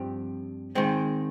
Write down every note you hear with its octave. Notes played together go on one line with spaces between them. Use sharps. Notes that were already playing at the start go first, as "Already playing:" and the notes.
Already playing: G2 F3 C4 G4
D#3 G#3 C4